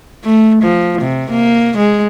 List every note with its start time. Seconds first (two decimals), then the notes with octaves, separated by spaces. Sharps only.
0.24 A3
0.63 F3
1.02 C3
1.31 A#3
1.78 G#3